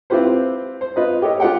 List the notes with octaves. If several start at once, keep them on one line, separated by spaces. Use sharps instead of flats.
C4 E4 F4 G4 B4 C5
C5
F4 B4 D#5
G4 A4 C#5 D#5
F4 G4 F#5 G5